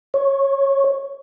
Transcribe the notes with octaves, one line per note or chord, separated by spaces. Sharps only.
C#5